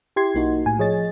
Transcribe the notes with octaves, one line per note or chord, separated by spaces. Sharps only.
E4 G4 C6 G#6 C7
B1 A#3 D#4 F#4
A2 G#5
F3 G#4 C#5 D#5 A6